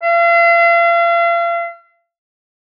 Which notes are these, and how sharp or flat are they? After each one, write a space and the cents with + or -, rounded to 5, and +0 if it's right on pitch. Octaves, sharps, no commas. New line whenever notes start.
F5 -40